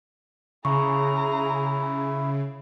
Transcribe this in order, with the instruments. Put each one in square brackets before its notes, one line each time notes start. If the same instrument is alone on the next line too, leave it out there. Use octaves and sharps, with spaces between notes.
[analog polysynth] C#3 [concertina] E4 [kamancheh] G#4 A#5 [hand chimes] C#6